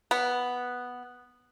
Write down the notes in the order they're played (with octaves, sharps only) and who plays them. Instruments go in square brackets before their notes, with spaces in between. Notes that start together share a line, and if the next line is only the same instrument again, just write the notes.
[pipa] B3